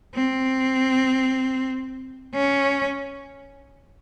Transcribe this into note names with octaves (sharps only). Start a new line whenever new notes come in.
C4
C#4